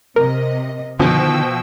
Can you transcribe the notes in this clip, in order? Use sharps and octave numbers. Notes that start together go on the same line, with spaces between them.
C3 A#4 D#5
B2 D3 D#3 F3 G5 E6